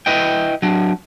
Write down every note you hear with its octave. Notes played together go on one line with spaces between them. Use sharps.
E4 B4 D#5 G5
F#3 D4